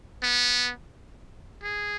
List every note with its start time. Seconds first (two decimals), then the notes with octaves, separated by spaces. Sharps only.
0.22 B3
1.63 G#4